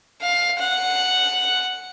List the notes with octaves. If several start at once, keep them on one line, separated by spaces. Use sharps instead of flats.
F5
F#5